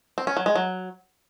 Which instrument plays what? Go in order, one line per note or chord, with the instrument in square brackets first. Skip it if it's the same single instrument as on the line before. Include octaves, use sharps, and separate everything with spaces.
[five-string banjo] C4
C#4
F#3
G#3
F#3